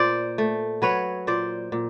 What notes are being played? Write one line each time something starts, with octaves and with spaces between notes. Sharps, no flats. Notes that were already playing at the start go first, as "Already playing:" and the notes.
Already playing: A#2 C5 D5
A3
F#3 B4 C#5
A#2 C5 D5
A#2